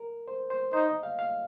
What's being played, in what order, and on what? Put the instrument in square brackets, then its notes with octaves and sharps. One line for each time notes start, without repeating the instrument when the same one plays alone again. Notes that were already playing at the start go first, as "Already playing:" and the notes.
Already playing: [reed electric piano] A#4
C5
C5
[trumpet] D#4 [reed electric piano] C5
[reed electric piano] D#5
F5
F5